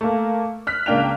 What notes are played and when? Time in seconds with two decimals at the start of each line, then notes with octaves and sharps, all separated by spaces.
0.01 A3 A#3
0.67 F6 F#6 B6
0.86 C#2 A#3 D4 G5 F7